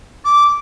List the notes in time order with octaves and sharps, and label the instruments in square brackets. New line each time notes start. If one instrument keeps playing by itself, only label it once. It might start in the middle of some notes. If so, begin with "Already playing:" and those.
[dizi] D6